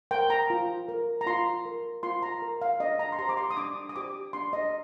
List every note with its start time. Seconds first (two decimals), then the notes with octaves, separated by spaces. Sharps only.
0.11 A#4 G5
0.30 A#5
0.50 F4
0.89 A#4
1.21 A#5
1.27 F4 C6
1.65 A#4
2.03 F4 C6
2.23 A#5
2.42 A#4
2.62 F5
2.80 D4 D#5
2.99 A#5
3.12 C6
3.19 G4 C5 A#5
3.29 D6
3.37 C6
3.51 D#6
3.57 D4 D6
3.89 D#6
3.96 G4 C5 D6
4.33 D4 C6
4.53 D#5